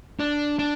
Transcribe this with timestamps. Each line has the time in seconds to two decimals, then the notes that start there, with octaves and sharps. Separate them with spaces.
0.20 D4
0.59 D4